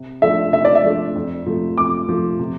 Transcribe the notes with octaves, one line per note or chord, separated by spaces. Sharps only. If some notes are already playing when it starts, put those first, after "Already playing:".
Already playing: C3
F3 A3 D4 A4 E5
C3 E5
D5
E5
F3 A3 D4 A4
F2
C3 F3 A3
F2 D6
C3 F3 A3
C3